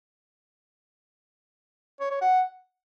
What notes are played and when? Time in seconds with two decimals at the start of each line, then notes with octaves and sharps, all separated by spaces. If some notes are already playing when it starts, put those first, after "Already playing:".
2.00 C#5
2.11 C#5
2.21 F#5